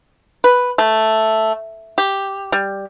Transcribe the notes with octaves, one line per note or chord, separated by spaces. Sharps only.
B4
A3
G4
G3